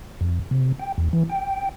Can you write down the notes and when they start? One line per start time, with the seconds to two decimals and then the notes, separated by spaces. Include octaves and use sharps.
0.21 F2
0.51 C3
0.79 G5
0.98 E2
1.13 E3
1.29 G5